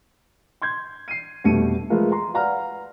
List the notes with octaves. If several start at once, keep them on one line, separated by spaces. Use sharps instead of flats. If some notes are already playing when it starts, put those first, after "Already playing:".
C6 G6 G#6
C7 D#7
F1 B2 G3 A3 C#7 D#7
F3 G#3 A3 F4 A#4 B4
A#5 C6
B4 D5 F5 F#5 A#5 F6